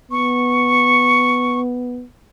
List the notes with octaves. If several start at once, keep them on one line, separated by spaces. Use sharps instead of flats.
B3 C#6